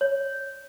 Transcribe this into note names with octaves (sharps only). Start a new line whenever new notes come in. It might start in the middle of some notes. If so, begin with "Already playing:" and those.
C#5